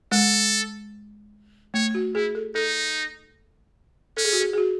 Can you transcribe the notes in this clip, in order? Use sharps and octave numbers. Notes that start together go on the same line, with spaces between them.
G#3 A4
A3 C#5
F#4
E4 G#4
A4
D#4 A4
C#4 A4
G#4
F#4
G#4
G#4
F#4